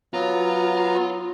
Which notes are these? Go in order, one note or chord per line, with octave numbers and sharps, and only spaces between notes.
F#3 B3 F4 A#5